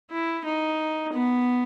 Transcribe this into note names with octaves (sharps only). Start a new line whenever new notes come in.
E4
D#4
B3